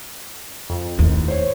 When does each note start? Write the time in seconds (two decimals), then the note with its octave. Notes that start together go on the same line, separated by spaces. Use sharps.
0.70 F2
0.99 D#2 A2
1.28 C5 C#5